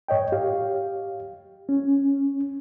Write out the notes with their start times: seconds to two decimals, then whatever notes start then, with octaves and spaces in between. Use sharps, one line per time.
0.08 G#2 C#5 D#5 G5
0.32 G4 F5
1.69 C#4